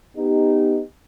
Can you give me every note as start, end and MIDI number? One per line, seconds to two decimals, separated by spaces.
0.16 0.79 59
0.16 0.79 63
0.16 0.79 67